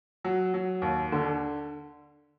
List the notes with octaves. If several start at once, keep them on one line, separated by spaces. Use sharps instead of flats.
F#3
F#3
D#2
D3